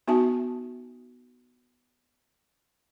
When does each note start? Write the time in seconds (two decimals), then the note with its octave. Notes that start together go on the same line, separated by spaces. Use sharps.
0.08 B3 D#4 F#4 E5 A5